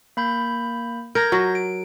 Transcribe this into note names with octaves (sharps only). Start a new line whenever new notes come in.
A#3 B5 G6
A#4 G6 G#6 A#6
F#3
D7